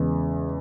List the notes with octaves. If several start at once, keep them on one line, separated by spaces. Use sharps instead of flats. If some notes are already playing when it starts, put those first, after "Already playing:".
Already playing: E2 C#3 G#3 B4